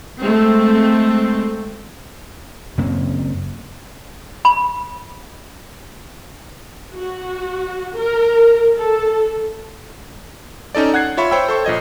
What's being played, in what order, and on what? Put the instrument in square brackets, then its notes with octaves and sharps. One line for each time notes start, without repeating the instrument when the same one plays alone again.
[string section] G#3 A3 C4
[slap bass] F#2 C#3 A#3 C4
[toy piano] B5
[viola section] F#4
A#4
A4
[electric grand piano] C#4 D#4 A4 D5
F#5 F#6 G#6 C7
F4 C#5 E5 B5 C#6
C5 C#5 G5 B5 E6
A4 C5 C#6
A#1 F3 D#5 G#6